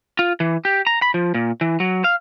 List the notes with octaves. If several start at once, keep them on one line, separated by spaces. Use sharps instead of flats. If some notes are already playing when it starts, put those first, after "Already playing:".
F4
E3
G4
A#5
B5
F3
A#2
E3
F#3
F5